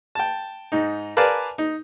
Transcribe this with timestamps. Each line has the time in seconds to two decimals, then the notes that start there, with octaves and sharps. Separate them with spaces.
0.15 G5 A5
0.72 G#2 D#4
1.17 A#4 B4 D5 F5 G#5 A5
1.58 D#4